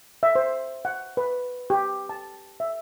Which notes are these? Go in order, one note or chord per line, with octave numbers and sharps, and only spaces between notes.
E5
C5
F#5
B4
G4
A5
E5